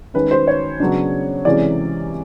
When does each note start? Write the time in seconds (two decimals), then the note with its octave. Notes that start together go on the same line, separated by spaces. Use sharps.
0.14 D#3 G#3 C#4 B4
0.31 C5
0.47 C#5
0.80 C#3 F#3 B3 D4
1.45 C3 E3 G#3 C#4 D5